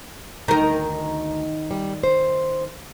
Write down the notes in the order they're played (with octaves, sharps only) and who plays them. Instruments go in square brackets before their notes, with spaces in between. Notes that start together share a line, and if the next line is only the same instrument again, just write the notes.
[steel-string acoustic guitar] D2 A#5 [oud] D#3 A#4
[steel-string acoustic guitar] G3
C5